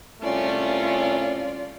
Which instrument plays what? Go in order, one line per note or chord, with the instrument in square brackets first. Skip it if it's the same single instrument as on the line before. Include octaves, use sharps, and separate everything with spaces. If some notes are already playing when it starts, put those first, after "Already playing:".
[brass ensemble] C2 A3 C#4 [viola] F4 D5